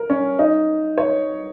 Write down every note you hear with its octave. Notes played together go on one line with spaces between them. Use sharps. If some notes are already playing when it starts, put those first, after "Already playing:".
Already playing: A#4
C#4
D#4
C#5